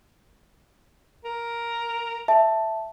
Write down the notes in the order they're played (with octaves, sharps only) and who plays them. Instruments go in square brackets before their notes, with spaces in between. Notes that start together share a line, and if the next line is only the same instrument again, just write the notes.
[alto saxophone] A#4
[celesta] E5 A5